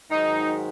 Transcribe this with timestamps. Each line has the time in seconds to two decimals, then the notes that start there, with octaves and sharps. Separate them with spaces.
0.11 G#2 D#3 F#3 D#4